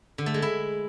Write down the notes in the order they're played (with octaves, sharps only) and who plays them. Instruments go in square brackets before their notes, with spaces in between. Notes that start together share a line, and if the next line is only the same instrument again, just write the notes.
[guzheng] D3
A3
G#3
E4